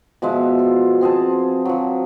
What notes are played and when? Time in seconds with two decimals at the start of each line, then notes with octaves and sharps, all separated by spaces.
0.22 B2 F3 G#3 E5
0.59 F4
1.01 C4 G#4 C5 A5
1.65 F3 F#3